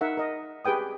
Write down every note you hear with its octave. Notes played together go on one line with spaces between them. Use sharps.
D#4 A#4 E5 F#5
A#4 D#5
G4 G#4 B4 G5 D#6